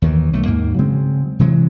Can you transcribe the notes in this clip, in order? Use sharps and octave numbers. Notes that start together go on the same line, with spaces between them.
D#2 D#3 E3
B1 A3
D#2 G#2 D#3 A#3
C#3 F#3 G#3 C4
C3 E3 F#3 G#3